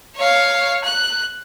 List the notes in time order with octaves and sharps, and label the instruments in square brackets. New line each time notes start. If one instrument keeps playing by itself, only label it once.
[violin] C#5 F5
F#6